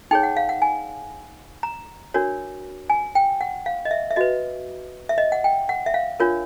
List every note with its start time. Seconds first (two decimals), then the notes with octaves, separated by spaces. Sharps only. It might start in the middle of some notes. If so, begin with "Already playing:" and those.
0.11 D#4 G#4 C#5 G5
0.23 F#5
0.37 F5
0.49 F#5
0.62 G#5
1.63 A#5
2.14 D4 F#4 A#4 C#5
2.90 G#5
3.15 G5
3.41 F#5
3.66 F5
3.85 D#5
3.91 E5
4.11 E5
4.16 F#4 B4 D#5
5.09 E5
5.18 D#5
5.32 F#5
5.44 G5
5.69 F#5
5.86 E5
5.94 F5
6.20 D4 F4 A#4 C#5